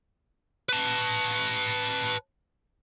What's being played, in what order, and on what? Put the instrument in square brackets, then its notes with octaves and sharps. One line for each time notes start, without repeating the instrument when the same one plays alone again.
[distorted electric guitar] B4 A5